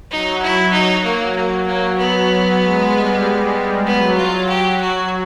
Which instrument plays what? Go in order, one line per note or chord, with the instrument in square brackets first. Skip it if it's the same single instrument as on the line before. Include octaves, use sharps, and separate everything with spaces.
[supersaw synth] F#3 [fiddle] D#4
[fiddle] E4
D#4
A#3
A#3
A#3
B3
[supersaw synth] G#3
G3
[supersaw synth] F#3 [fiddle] B3
[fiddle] F4
G4
F#4